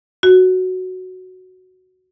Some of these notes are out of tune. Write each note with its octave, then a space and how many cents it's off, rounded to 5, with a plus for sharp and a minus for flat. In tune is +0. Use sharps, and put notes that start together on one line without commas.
F#4 +0